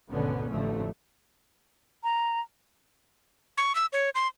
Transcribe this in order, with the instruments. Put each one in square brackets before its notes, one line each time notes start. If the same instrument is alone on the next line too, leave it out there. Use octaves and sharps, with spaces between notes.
[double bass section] G#1 D2 B2 D3 B3 C#4
A1 F2 D3 F3 A3
[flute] A#5
[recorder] C#6
E6
C#5
C6